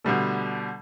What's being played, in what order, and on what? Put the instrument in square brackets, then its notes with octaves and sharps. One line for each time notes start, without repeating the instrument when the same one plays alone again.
[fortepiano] B2 D3 G3 A3